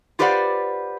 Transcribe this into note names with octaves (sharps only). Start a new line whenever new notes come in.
F4 G4 B4 C5 D5 F#5